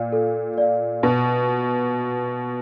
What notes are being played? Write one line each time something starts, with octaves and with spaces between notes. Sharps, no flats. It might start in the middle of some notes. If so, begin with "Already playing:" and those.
Already playing: A#2 D5 F5
A4
D5 F5
B2 F#4